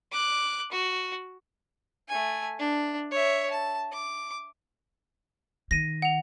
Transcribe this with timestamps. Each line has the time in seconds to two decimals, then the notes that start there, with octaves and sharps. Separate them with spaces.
0.12 D6 F#6
0.71 F#4
2.08 A3 G#5
2.59 D4
3.11 C#5 E5
3.51 A5
3.92 D6
5.71 D#3 A#6 D#7
6.02 F#5 F7